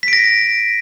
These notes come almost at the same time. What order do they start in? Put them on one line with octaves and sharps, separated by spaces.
B6 D7 A#6